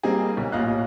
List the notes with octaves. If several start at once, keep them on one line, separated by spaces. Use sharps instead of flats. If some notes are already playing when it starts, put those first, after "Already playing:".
G3 A#3 C4 D#4 G#4
B1
A1 A#2 D#5 F5 F#6